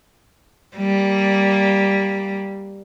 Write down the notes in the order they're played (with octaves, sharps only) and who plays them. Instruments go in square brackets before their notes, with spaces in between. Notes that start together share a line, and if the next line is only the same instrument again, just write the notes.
[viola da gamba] G3 A#3